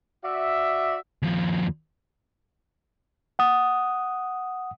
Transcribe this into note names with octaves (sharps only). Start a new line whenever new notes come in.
F#4 D5 E5
D#2 F3
F#5 D#6